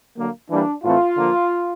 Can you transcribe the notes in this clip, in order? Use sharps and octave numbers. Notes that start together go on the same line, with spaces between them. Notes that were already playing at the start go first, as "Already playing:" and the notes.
D3 F#3 A#3
E3 G3 A#3 D4
A2 E3 A3 C4 F4
D3 F3 A#3